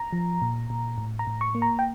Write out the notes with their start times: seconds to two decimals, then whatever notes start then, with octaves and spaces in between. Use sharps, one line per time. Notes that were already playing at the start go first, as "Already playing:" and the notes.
Already playing: A#5
0.13 F3
0.42 A#2
0.70 A#2
0.98 A2
1.19 A#5
1.27 A2
1.41 C#6
1.55 A#3
1.62 A#5
1.79 G5